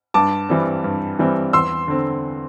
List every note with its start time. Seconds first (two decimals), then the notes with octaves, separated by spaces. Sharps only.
0.14 G2 A5 D6
0.49 E3 G3 C4
0.84 G2
1.19 E3 G3 C4
1.53 E2 C6 E6
1.88 D3 C4